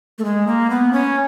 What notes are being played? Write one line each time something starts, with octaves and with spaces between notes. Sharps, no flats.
A3
G#3
A#3
B3
C#4